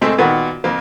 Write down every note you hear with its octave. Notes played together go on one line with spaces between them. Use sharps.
A#2 G#3 A3 C4
A#2 D#3 B3 F#4
F2 A#3